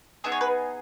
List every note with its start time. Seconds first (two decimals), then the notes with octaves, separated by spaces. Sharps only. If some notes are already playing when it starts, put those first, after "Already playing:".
0.24 B3 D#4 G#4 E5
0.32 C#5
0.41 B4